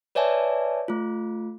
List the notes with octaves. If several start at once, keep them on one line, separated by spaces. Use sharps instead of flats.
B4 C#5 D5 E5 G#5 A5
A3 F4